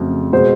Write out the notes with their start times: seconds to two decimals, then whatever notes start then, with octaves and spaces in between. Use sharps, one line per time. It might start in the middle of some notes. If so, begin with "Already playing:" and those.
Already playing: F2 C#3 F#3 A3
0.33 B2 G#3 C5